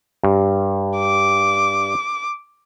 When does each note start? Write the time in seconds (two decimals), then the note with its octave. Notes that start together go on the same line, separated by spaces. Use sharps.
0.23 G2
0.97 D6